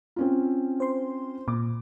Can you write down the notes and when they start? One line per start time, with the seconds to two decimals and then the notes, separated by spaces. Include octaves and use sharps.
0.16 C4 C#4 F4
0.80 C5 C6
1.48 A#2 D6